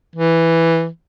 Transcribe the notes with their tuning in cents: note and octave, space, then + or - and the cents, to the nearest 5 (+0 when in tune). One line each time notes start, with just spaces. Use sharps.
E3 +0